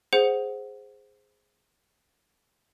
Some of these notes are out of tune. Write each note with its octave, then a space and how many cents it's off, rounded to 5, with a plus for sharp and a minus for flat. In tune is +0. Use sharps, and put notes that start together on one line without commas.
G#4 +0 C5 +0 F#5 +0